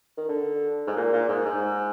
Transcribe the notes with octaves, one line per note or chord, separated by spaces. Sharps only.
D#3
D3
G#2
A#2
A#2
G#2
G#2